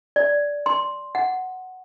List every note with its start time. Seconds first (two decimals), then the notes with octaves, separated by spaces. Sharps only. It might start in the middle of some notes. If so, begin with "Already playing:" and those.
0.16 D5
0.66 C6
1.15 F#5